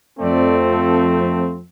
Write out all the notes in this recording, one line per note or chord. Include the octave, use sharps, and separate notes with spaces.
F2 F3 A3 C4 D5
A4